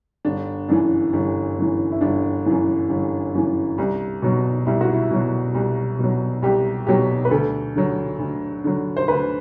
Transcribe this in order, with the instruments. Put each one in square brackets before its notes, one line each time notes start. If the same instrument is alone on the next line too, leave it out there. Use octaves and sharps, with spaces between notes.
[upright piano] G1 D4
F#2 E3 D4
G1
F#2 E3
E4
G1 D4
F#2 E3
G1
F#2 E3
C2
B2 F#3
C2 E4
F#4
E4
B2 F#3
C2
B2 F#3
C2 G4
B2 F#3 G4
B4
D2 A4
D3 F#3
D2
D3 F#3
C5
D2 B4